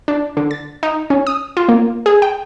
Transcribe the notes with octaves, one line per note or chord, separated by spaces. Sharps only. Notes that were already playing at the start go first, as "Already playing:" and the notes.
D4
D3
A6
D#4
C#4
D#6
F4
A#3
G#4
G5